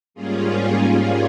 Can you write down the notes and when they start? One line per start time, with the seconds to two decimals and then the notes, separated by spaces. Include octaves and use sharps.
0.14 G#2 G3 A#3 C#4 F4 G#4
0.79 F4 G#4